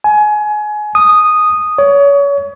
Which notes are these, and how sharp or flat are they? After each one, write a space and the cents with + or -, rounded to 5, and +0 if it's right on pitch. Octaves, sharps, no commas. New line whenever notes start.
G#5 +25
D#6 -5
C#5 +30